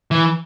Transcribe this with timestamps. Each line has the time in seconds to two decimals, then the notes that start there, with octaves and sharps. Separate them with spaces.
0.11 E3